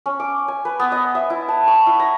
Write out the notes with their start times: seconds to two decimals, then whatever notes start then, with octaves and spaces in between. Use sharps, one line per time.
0.06 C#4
0.20 D6
0.48 G#5
0.65 B4
0.80 B3
0.92 D#5
1.15 E5
1.30 E4
1.49 A5
1.67 C#6
1.87 E4
2.00 A#5